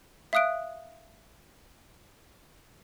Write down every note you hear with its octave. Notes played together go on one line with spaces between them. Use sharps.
E5 F5 D#6 F#6 D7